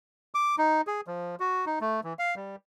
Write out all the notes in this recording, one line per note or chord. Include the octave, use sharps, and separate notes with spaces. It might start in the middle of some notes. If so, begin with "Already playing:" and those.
D6
D#4
G#4
F3
F#4
D#4
A3
E3
F5
G3